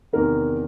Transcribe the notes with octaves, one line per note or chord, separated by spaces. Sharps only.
E2 C3 D#3 A#4